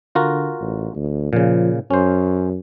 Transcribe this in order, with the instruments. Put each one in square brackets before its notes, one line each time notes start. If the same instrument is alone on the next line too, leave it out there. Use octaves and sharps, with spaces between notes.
[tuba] D3 [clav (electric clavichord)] F4 F#4 A#4
[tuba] A1
D2
[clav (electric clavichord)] A#2 C#3 [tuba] F3
[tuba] F#2 [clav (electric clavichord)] C#4 C5